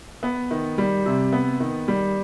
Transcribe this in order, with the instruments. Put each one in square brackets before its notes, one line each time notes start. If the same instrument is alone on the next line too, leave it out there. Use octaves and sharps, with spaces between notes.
[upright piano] B3
D#3
G3
C3
B3
D#3
G3